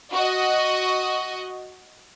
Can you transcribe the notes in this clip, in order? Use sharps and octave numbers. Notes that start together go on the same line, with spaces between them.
F#4 D#5